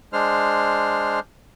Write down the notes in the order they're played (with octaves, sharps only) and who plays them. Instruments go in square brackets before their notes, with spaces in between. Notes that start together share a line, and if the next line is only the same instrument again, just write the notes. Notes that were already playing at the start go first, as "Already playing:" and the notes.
[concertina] G#3 D4 C5 F6